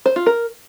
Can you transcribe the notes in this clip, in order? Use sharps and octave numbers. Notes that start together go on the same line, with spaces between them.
C5
F4
A#4